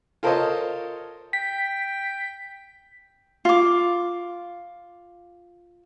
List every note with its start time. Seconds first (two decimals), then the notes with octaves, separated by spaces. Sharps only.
0.23 F4 A4 A#4 C5 C#5 D#5
1.33 G5 B6
3.45 F4 D6